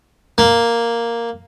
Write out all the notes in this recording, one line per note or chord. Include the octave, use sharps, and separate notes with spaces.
A#3